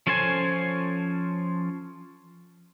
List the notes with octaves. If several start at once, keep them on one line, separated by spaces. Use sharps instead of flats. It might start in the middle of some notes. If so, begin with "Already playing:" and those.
F3 C#4 A4 C5 G#5